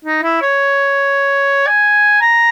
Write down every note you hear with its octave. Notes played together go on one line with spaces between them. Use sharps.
D#4
E4
C#5
G#5
A#5